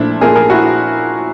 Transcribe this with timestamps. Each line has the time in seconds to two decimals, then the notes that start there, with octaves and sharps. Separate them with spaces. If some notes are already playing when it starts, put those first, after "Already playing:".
Already playing: A#2 F3 A3 D4 E4
0.21 A#2 F3 A3 G#4 A#4
0.35 G#4 A#4
0.50 E4 F#4